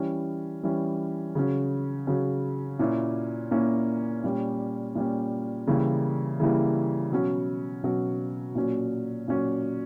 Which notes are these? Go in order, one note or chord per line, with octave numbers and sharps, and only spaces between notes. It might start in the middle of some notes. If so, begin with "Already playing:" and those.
Already playing: E3 G3 C#4
E3 G3 C#4
C#3 F#3 C#4
C#3 F#3 C#4
A#2 A#3 C#4 E4
A#2 A#3 C#4 E4
A#2 G3 C#4
A#2 G3 C#4
C#3 E3 G3 A#3 E4
C#3 E3 G3 A#3 E4
B2 F#3 C#4
B2 F#3 C#4
A#2 F#3 C#4
A#2 F#3 C#4